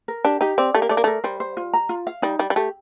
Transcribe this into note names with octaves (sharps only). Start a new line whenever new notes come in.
A#4
D4 G4
D#4 G4
C4 D5
A3 G4
A#3
A3 D5
A#3
A3 A#4
G3 C5
C5
F4
A#5
F4
F5
G3 D#4
G3 D5
G3
A3 G4